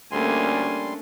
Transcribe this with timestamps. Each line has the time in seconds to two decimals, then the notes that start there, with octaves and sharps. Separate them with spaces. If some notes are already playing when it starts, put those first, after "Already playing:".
0.12 D2 G3 A3 A#3 C#4 D4 G#5 C6